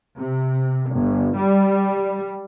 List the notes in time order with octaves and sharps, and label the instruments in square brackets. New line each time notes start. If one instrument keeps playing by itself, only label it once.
[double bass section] C3
G1
G3